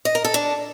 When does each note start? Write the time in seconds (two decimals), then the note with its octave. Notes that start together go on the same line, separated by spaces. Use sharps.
0.05 D#5
0.15 A#4
0.25 A4
0.34 D4